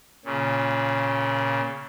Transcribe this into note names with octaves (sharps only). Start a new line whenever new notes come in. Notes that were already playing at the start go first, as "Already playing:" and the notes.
A#2 C#3